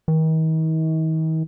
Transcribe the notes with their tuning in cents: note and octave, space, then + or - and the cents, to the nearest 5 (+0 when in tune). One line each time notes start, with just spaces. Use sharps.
D#3 +40